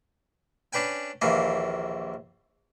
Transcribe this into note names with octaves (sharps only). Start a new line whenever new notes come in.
C#4 D4 B4 G5 G#5
A#1 D#2 E3 A#3 G#5